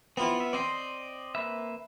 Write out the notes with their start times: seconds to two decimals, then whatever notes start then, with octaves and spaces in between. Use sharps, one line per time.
0.17 B3 C4 E4 F4
0.40 E5
0.53 C4 D5 D#5 C6
1.35 A#3 B4 E5